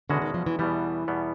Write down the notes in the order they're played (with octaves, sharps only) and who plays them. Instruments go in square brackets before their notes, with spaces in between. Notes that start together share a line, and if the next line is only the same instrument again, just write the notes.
[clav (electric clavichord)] E2 B2 G#3 C#4 F#4 [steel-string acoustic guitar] D3
[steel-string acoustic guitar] D#3
F3
E3
[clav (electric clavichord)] E2 B2 G3 B3 [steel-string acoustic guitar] E3
[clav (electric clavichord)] E2 B2 G3 B3